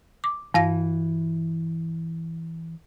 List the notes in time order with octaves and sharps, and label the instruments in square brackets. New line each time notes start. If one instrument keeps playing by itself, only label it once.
[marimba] D6
[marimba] G2 F5 A#6 [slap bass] E3